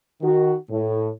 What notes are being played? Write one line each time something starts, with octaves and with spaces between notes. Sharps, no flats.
D#3 F#4
A2